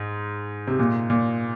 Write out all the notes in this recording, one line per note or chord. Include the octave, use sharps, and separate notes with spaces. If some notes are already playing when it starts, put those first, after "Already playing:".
Already playing: G#2
C3
A#2
A#2